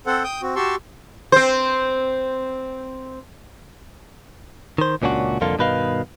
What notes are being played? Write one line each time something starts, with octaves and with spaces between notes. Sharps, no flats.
C4 A4 C5 F#5
G5 D#6 G6
C4 F#4
F#4 G4 A5 C6 C#6 E6
C4 C5
D#3 C5
C#2 A#2 C#4 D4 F#4
C2 F2 D3 A#3 F4 A4
G2 B2 D#3 B4 D#5 F5